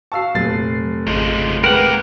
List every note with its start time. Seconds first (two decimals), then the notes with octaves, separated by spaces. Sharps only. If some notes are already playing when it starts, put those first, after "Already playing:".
0.12 F#4 F5 A5 C#6 E6 C7
0.35 F1 A#2 F#3 A6 C7
1.07 G#1 C#3 F3 G#3
1.64 G#3 A#3 G4 A#4 B4 F#5